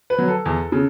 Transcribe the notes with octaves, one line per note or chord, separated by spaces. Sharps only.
B4
F#3
A4
E2
C#3